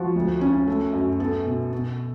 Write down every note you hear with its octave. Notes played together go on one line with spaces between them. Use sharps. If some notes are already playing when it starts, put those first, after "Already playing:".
Already playing: F3 F#4
D2
C#4
A3
F#2
B3 A4
B2
B2